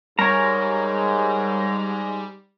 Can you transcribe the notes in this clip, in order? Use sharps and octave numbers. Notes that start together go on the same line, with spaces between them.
G#2 G3 G#3 A#4 C#5 A#5